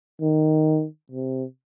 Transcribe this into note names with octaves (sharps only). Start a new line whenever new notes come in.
D#3
C3